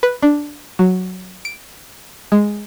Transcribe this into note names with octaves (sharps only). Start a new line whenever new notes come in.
B4
D4
F#3
D7
G#3